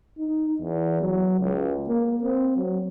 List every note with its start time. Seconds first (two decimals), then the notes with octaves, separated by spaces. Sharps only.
0.18 D#4
0.61 E2
1.01 F#3
1.40 C#2
1.88 A#3
2.23 C4
2.56 F#3